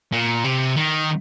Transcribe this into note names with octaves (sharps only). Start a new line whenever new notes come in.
A#2
C3
D#3